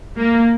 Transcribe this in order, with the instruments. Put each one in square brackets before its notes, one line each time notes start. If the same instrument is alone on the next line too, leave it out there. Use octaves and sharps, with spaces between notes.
[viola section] A#3